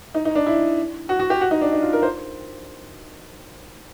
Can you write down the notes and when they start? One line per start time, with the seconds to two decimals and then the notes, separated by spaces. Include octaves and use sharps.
0.15 D#4
0.25 D#4
0.35 D4
0.46 E4
1.09 F#4
1.20 F#4
1.30 G4
1.41 F#4
1.51 D#4
1.61 D4
1.72 D#4
1.82 F4
1.93 A#4
2.03 C5